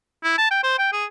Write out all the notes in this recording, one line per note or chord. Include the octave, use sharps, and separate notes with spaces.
E4
A5
G5
C5
G5
G#4